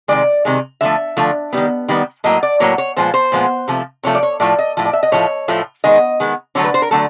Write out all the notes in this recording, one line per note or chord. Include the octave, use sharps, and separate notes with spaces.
C3 D#3 G#3 D5
C3 D#3 G#3
D3 F3 A3 E5
D3 F3 A3
D#3 G3 B3
D#3 G3 B3
A2 F#3 A#3 D#5
D5
A2 F#3 A#3 C#5
C#5
A#2 F3 G#3 B3 C5
C5
A#2 F3 G#3 B3
C3 F3 A3
C3 F3 A3 C#5
D5
C#5
A2 F3 A3 D5
D#5
A2 F3
D5
E5
D#5
A2 F3 A3 C#5
A2 F3 A3
D#3 G#3 B3 D#5
D#3 G#3 B3
D3 F#3 A3 C#5
B4
C5
A#4
D3 F#3 A3 A4